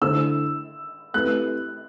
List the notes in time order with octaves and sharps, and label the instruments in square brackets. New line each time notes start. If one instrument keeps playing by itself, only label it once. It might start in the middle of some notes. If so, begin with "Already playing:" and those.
[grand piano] D3 A3 E4 A4 C5 [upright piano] E6
[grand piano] A3 C4 E4 G4 B4 [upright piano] F#6